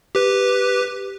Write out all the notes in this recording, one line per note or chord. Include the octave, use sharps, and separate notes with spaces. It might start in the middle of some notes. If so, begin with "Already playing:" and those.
G4 B4